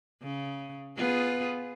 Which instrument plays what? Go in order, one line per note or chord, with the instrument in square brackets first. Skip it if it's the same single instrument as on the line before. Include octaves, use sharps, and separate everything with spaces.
[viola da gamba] C#3
B3 F4 G#4